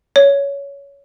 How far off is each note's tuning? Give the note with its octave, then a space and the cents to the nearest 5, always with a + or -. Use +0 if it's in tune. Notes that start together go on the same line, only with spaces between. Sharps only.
C#5 +15